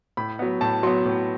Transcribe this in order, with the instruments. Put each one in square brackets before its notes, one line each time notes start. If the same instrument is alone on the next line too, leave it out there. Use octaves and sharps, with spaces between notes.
[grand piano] A2 B5
F#3 B3
A2 A5
F#3 B3 C6
A2